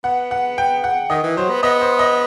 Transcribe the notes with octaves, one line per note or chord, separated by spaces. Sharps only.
B3 F#5
F#5
G5
F#5
D#3 D#5
E3
F#3 C5
B3
B3 D#5
C5
D#5